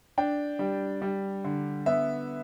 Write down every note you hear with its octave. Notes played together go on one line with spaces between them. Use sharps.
D4 G5
G3
G3
D3
B3 E5